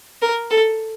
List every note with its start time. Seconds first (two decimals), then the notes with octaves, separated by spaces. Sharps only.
0.22 A#4
0.50 A4